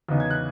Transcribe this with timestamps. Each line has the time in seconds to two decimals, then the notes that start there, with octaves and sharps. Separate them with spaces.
0.08 E2 C#3 E3 B3 D#4
0.20 G#6
0.30 F#6